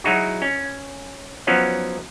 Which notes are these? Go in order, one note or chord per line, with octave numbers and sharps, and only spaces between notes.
F#3 G#3 D#4 E4 F#4
C#4
F3 F#3 B3 C#4 D#4